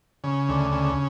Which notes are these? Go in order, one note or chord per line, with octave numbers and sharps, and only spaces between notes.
C#3
D2
C#3